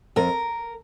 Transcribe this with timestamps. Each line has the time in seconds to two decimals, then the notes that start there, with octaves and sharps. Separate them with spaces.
0.16 F2 A#4